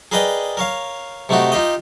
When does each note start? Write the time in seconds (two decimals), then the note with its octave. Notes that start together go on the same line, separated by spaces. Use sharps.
0.12 G#4 A#4 B4 D5 D#5 G5
0.57 A#4 C#5 F5
1.29 C3 A3 D#4 F#4 G4
1.52 D#4 F4 G4 D#5